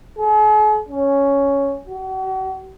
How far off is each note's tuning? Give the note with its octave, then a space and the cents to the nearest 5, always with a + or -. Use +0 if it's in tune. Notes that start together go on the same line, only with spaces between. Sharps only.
G#4 +45
C#4 +5
F#4 +40